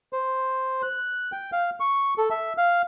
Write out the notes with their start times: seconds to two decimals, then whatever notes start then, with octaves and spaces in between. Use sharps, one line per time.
0.13 C5
0.83 F#6
1.32 G5
1.52 F5
1.80 C#6
2.18 A4
2.30 E5
2.57 F5